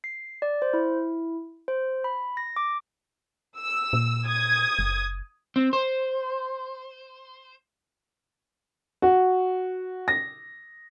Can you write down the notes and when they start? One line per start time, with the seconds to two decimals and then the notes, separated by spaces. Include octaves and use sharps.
0.04 C7
0.42 D5
0.62 C5
0.74 E4
1.68 C5
2.04 B5
2.37 A#6
2.56 D6
3.59 E6
3.93 A#2
4.26 D#6 G#6
4.79 F#1
5.56 C4
5.73 C5
9.02 F#4
10.08 A#6